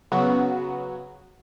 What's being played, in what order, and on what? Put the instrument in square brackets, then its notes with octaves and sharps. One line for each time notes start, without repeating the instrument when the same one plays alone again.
[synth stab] C#3 F#3 B3 F#4